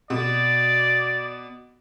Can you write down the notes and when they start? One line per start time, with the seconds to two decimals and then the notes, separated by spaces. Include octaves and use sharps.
0.10 B2 D5